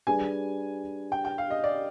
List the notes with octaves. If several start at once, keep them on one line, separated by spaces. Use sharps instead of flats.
G3 D4 G#4 B4 G#5
G5
G5
F5
D#5
D5